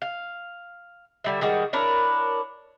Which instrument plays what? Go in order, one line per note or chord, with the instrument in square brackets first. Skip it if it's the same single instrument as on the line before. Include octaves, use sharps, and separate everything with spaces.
[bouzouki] F5
D3 G3 E5
D#3 G3 G#3 F#4
D4 E4 A#4 C#5